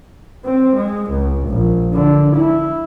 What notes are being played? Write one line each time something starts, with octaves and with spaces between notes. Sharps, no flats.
C4
G#3
C#2
A#1
D3
E4